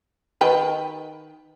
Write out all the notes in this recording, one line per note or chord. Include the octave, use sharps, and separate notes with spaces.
D#3 B4 G5